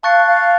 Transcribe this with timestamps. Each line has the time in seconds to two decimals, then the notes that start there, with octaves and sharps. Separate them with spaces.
0.03 F5 A5 C#6 F#6 A6 C#7
0.27 F5